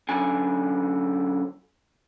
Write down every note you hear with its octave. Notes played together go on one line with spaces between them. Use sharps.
F#2 D3 G#5